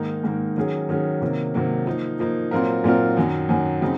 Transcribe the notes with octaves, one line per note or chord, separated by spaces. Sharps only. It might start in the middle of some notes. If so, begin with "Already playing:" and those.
Already playing: G#2 D#3 A#3 D#4
G#2 D#3 A#3 D#4
D#3 F#3 C#4 G#4
D#3 F#3 C#4 G#4
C3 D#3 F#3 A#3
C3 D#3 F#3 A#3
F3 A#3 D#4
F3 A#3 D#4
A#2 F#3 C4 F4 A#4
A#2 F#3 C4 F4 A#4
F#2 D#3 F#3
F#2 D#3 F#3
C#3 F#3 C4 D#4